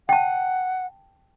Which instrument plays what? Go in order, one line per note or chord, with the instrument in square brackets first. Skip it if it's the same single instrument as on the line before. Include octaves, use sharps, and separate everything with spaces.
[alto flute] F#5 [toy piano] G5 A5